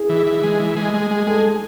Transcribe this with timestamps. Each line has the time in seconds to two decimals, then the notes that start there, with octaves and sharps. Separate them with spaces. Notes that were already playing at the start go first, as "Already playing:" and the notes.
Already playing: E4 G#4
0.09 E3
0.27 E3
0.43 G#3
0.60 E3
0.76 G#3
0.94 G#3
1.11 G#3
1.27 G#3 A4